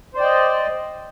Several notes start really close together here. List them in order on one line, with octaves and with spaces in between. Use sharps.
C5 D5 G5 D#5